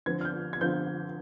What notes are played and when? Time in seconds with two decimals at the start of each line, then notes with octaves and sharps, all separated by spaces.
0.06 D3 F3 C4 F4 G#6
0.21 F6
0.25 G6
0.53 G#6
0.61 D3 F3 C4 F4 G6